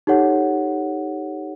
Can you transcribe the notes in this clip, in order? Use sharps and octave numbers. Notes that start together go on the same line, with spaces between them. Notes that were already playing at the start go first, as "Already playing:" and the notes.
D#4 G4 A4 C#5 F#5